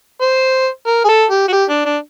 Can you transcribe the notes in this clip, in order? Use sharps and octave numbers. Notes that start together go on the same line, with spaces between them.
C5
A#4
G#4
A4
G4
F#4
G4
D4
D4